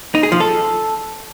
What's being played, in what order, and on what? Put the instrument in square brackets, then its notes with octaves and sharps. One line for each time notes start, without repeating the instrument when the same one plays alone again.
[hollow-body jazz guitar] D#4
G#4
F3
A4